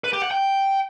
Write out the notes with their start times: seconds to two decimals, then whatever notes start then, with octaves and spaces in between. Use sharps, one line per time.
0.04 B4
0.13 G4
0.22 F#5
0.31 G5